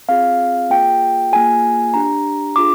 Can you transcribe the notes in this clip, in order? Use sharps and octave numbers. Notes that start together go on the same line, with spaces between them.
C4 F4 G#4 F5
A#3 F4 G#4 G5
A#3 F4 G#4 G#5
D4 G4 A#5
D4 F4 G#4 D6